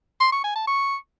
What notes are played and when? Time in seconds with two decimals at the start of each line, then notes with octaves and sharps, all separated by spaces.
0.20 C6
0.32 C#6
0.44 G#5
0.56 A5
0.67 C#6